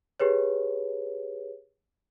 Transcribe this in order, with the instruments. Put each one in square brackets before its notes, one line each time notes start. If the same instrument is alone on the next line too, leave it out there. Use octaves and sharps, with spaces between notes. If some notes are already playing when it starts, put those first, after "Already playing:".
[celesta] G4 G#4 B4 C#5